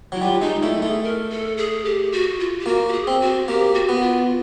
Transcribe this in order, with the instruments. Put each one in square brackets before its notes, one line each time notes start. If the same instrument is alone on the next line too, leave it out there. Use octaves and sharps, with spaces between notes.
[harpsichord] F#3 [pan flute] E4
[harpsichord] G3 [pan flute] F4
[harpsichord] G#3 [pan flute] D#4
[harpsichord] A3 [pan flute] E4
[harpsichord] A3 [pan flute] G#4
[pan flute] A#4
A4
G#4
G4
F#4
F4
G4
[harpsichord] A#3 [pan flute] F#4
[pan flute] G4
G#4
[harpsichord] C4
[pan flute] F#4
[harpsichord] A#3 [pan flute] G4
[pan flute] F#4
[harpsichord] B3
[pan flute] F4